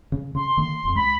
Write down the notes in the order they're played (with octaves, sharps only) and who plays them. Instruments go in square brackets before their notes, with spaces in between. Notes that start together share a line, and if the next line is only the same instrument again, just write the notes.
[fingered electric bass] C#3
[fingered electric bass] C#3 [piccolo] C6
[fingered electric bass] D3 D#3 A#3
E1 F2
[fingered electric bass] C#2 G#3 [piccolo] B5